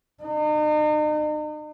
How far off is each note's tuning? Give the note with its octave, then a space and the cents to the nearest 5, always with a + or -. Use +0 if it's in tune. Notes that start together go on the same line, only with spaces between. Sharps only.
D#4 -40